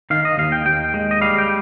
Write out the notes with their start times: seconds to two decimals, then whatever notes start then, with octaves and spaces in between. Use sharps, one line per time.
0.10 D#3 F5
0.25 D#5
0.38 D#2 F5
0.52 G5
0.66 D#2 G5
0.94 G#3
1.11 D#5
1.21 G3 F5
1.38 G5